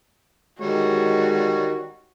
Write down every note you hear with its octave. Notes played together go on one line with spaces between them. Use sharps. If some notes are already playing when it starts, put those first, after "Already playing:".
D#3 G3 G#3 F#4 C#5